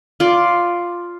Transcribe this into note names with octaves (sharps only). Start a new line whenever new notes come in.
F4 D5